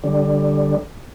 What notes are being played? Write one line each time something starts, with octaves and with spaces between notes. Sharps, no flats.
D3 G3